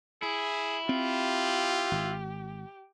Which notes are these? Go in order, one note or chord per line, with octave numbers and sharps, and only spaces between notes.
E4 G#4
C4 F4 G4
G#1